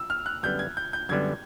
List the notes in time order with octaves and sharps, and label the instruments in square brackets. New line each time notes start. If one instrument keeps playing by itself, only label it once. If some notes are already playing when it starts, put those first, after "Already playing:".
Already playing: [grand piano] E6
F6
F#6
[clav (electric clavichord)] F#2 D3 G3 B3 [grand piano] G6
[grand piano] G#6
G6
G6
[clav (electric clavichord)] F#2 D3 G3 B3 [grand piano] G#6